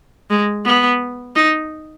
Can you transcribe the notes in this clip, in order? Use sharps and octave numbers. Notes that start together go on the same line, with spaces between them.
G#3
B3
D#4